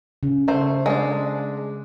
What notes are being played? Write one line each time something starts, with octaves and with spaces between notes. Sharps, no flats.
C#3
A3 C5
G#3 D4